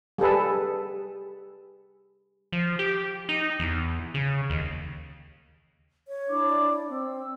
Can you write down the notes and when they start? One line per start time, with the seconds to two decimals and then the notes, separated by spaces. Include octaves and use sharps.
0.18 G3 G#4 A4 B4
2.52 F3
2.79 G4
3.29 D#4
3.59 E2
4.14 C#3
4.50 D#2
6.08 C#5
6.27 D4 E4 D6
6.49 D5
6.89 C4 E6